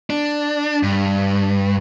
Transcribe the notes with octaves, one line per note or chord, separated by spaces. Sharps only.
D4
G2